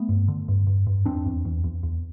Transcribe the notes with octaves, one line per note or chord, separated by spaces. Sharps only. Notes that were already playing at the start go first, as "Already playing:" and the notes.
Already playing: A3 B3
G2
D3
G2
G2
G2
E2 C4 D4
E2
E2
E2
E2